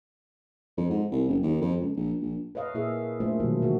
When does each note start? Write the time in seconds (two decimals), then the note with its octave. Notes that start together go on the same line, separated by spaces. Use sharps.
0.78 F2
0.90 G#2
1.12 C2
1.28 F#1
1.43 D#2
1.61 F2
1.80 C#2
1.96 A#1
2.22 A#1
2.55 B4 C#5 D#5 F5
2.74 A#2 A#3 E4 G#4 E5
3.20 A3 A#3 D4 F4 C5
3.40 B2 D#3 E3 F#3 G3 A#3
3.62 D3 E3 F#3 A#3 F#4